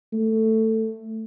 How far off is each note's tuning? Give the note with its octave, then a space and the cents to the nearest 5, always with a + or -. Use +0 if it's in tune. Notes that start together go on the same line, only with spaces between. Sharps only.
A3 +10